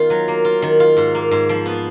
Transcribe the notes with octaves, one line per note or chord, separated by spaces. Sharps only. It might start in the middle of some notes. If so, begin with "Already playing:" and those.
Already playing: D#3 B3 F4
F#3
A#3
F4
D#3
F4
G#2
A#3
G#2
F3
B3